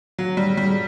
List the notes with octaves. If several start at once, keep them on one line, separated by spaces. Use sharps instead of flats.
F#3
G3
G3